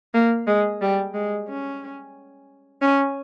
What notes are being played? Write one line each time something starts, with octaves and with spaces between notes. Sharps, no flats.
A#3
G#3
G3
G#3
C#4
C#4